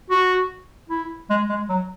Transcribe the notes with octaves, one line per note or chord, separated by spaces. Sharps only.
F#4
E4
G#3
G#3
F#3